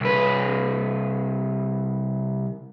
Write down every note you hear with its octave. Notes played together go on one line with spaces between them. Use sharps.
C2 B4